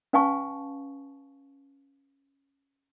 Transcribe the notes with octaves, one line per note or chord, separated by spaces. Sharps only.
C#4 B4 F5 G#5 A5 C#6